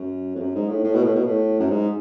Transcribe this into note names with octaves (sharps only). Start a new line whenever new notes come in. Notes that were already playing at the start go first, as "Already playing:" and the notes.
Already playing: F#2
F2
F#2
G#2
A2
A2
B2
A2
B2
A2
F#2
G#2